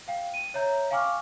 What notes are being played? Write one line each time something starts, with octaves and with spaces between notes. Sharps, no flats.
F5 G5
D#7
C#5 E5 A#5 G6
F5 G5 G#5 C#6 D6 F6